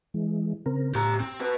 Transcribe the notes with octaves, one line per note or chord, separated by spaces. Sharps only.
E3 G#3
C#3 C4 A#4
A2 G4 A#5
C4
F#4 B4 A#5